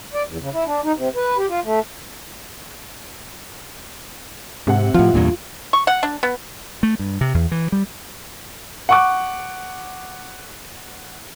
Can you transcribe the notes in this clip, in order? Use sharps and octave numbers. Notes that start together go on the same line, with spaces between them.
D5
E2
C#3
E4
D4
D#4
C3
B4
G4
F4
A3
G#2 C3 F#5
A2 F3 F4
E2 G2 A#2
C#6
F#5
D4
B3
A3
G2
C3
E2
E3
G3
F#5 C#6 D6